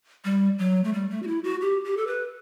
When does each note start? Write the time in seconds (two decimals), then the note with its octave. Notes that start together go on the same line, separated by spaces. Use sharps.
0.25 G3
0.58 F#3
0.84 A3
0.93 G3
1.10 A3
1.23 F#4
1.27 E4
1.44 F#4
1.61 G4
1.84 G4
1.97 A4
2.07 B4